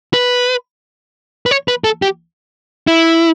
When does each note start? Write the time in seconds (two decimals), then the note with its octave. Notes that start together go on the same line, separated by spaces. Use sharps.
0.13 B4
1.46 B4
1.51 C#5
1.68 B4
1.84 A4
2.02 G4
2.87 E4